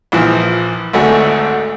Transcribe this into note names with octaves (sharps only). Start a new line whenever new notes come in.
A#1 E3 F3
G#1 D2 G#2 A3 F#4 F#5